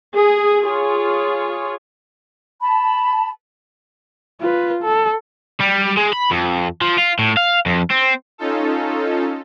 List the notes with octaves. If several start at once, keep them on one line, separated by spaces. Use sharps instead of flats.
G#4
F4 G#4 C#5
A5 B5
F4 B4
A4
G3
G#3
B5
F2
F3
F4
A2
F5
F2
C4
C#4 D#4 F4 A4